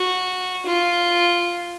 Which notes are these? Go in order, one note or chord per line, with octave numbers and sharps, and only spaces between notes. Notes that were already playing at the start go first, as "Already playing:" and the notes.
Already playing: F#4
F4